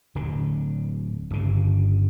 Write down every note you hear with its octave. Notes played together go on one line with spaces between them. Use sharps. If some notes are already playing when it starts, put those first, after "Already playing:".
D1 D3
G1 C#3